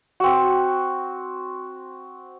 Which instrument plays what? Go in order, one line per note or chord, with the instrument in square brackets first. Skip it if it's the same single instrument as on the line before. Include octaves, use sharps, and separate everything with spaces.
[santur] C4 F#4